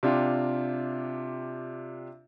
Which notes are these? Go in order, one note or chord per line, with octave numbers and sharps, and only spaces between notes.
C3 D4 F4 G4